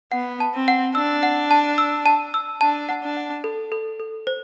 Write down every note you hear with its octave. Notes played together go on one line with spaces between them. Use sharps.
B3 F#5
A5
C4
F#5
D4 E6
F#5
A5
E6
A5
E6
D4 A5
F#5
D4
F#5
A4
A4
A4
C5